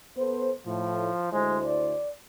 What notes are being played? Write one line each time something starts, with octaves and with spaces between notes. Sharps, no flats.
B3 A4 C5
A2 F3
D2 G#3 E4 C5
D5